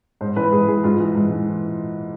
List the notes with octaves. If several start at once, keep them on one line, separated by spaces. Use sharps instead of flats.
G#2 C5
E3 B4
G#2 G#4
E3 G#4
G#2 F4
E3
G#2
E3